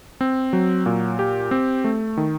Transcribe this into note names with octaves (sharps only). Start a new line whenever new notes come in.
C4
F#3
A#2
G4
C4
A3
D#3